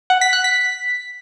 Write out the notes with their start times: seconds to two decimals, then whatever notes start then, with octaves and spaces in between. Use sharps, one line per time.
0.10 F#5
0.21 B6
0.33 F#6
0.44 B6